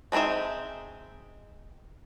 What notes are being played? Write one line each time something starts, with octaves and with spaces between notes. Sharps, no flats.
F3 G#3 C4 D#4 E5